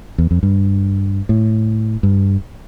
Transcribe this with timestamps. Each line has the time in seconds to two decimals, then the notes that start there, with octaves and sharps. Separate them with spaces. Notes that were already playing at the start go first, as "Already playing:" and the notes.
0.18 E2
0.31 F2
0.43 G2
1.29 A2
2.03 G2